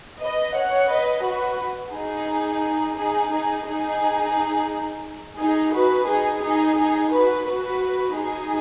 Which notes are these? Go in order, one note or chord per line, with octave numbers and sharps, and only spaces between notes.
B4 D#5
C#5 F#5
B4 D#5
F#4 B4
D#4 G#4
D#4 G#4
D#4 G#4
D#4 G#4
D#4 G#4
F#4 B4
D#4 G#4
D#4 G#4
D#4 G#4
F#4 B4
F#4 B4
D#4 G#4